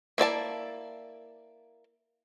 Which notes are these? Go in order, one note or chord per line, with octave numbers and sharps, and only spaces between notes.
A#3 E4 D5 A5